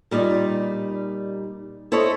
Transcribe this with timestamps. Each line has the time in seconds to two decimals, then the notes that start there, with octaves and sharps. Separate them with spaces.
0.11 A#2 G3 D#4 D5
1.92 E4 A4 C5 C#5 D#5